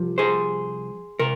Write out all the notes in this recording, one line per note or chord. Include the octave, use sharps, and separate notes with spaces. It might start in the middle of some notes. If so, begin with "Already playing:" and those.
Already playing: C2 C3 F3
G#4 C5
C3 A#4